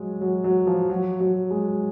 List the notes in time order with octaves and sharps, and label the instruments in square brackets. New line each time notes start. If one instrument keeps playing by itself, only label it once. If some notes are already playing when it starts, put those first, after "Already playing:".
Already playing: [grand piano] F#3 G#3
F#3
F#3
F3
F#3
F#3
G#3